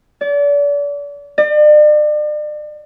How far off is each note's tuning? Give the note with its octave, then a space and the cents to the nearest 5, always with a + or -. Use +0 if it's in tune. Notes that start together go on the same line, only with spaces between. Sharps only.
D5 -35
D5 +40